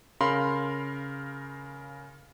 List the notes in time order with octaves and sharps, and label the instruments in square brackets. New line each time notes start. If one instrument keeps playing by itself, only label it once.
[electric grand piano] C#3 A#4 F5 B5 C6